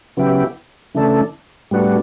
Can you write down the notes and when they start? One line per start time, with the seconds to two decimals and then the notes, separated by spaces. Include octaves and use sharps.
0.17 C#3 F#3 B3 E4 G4
0.95 C#3 E3 A3 D4 A4
1.71 A2 G3 B3 D4 F#4